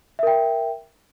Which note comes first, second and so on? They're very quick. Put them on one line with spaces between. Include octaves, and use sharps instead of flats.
E5 A#4 G5